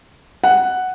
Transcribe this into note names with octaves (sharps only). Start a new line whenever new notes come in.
F#5